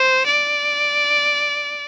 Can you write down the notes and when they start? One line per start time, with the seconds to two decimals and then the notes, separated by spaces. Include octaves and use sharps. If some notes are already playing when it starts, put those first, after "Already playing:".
Already playing: C5
0.26 D5